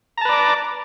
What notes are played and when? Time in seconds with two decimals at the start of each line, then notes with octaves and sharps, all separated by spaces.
0.18 A#5
0.21 A5
0.25 B4
0.29 D5
0.33 D6